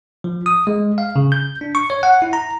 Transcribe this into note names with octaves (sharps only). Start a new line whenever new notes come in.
F3
D#6
G#3
F5
C#3
G6
D4
C#6
C#5
F#5
E4
A#5